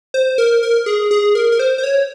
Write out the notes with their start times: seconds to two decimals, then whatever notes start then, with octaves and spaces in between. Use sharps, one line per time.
0.14 C5
0.38 A#4
0.63 A#4
0.86 G#4
1.11 G#4
1.35 A#4
1.52 A#4
1.59 C5
1.78 C5
1.83 C#5